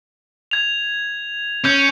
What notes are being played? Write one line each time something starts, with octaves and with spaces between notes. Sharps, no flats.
G#6 F7
C#4 G6